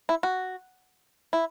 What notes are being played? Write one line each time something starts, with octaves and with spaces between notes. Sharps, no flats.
E4
F#4
E4